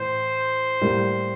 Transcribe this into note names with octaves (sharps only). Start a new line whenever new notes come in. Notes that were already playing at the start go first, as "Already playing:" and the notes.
Already playing: A2 E3 C5
A2 G3 A#3